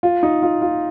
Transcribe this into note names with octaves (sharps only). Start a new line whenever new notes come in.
F4
D#4
F4
F4